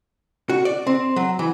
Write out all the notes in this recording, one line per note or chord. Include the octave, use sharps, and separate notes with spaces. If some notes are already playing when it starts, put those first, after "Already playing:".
F#4
D5
C4
F#3
E3